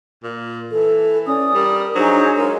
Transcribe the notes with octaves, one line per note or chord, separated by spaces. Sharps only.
A#2
E3 A4
C#4 D5 D#6
G3 A#4
F#3 D4 D#4 G#4 C5
G#3 F4 G#4 A#4 C#5